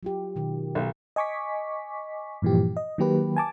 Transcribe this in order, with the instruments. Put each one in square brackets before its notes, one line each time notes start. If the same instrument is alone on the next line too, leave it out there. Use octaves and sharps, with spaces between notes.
[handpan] F#3 F4 G4
B2 D#3
[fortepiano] B1
[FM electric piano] D#5 G#5 C#6 D6 B6
G2 A#2 E3 F3 G4
D#5
D#3 F#3 A#3 G4 B4
G#5 A5 D6